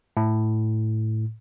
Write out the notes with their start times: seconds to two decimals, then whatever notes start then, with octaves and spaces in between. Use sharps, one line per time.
0.17 A2